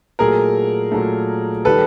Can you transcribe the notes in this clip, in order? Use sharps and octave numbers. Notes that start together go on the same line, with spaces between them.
A#2 F#3 A3 G#4 A#4
A#2 F#3 A3
D#3 G3 A4 B4